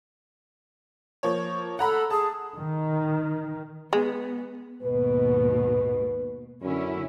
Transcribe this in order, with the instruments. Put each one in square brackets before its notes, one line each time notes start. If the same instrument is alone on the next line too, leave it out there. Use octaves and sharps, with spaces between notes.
[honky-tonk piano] F3 A#3 C#5
[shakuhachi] A4 [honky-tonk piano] F#5 A#5 B5
[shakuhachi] G#4 [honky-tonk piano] A5
[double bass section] D#3
[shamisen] G#3 [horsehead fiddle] B3
[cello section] D#2 G#2 B2 [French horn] B4
[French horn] F#2 [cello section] D3 C#4 E4